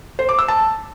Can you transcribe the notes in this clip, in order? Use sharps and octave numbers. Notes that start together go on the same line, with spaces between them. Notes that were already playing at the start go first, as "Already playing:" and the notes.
C5
D6
E6
A5